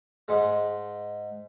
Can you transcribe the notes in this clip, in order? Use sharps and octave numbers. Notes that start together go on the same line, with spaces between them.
G#2 G#3